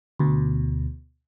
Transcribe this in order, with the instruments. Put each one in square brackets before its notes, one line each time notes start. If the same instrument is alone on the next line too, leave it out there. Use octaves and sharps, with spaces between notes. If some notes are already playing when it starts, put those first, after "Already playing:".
[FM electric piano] D2 B2